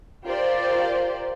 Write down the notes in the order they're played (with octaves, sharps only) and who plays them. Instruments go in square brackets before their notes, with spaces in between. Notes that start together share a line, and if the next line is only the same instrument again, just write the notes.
[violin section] F4 G4 A#4 C5 D5